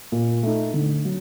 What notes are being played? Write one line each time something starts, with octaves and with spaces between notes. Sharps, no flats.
A#2
A3 D#4
D3
F#3